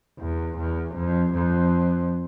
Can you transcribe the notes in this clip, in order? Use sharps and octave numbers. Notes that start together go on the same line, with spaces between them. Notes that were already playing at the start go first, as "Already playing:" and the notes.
E2
E2
F2
F2